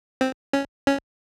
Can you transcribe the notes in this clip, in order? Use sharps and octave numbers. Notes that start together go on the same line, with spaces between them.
C4
C#4
C#4